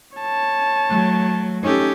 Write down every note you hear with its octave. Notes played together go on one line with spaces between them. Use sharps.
C#5 A5
F#3 A3
C#4 D#4 G4 A4